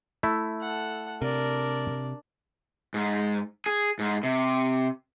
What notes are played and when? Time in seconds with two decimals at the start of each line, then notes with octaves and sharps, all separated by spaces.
0.23 A3 E4
0.61 A4 F#5
1.22 C3 D4 A#4 D5
2.94 G#2
3.66 G#4
3.99 G#2
4.23 C3